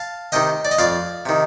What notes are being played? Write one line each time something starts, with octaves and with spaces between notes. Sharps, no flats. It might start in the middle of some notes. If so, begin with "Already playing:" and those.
Already playing: F5 A5
C3 D#3 D#5 G5
D5
D#5
F2 D5 F5
C3 D#3